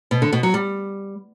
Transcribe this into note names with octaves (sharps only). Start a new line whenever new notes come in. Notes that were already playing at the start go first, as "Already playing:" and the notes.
B2
D3
B2
F#3
G3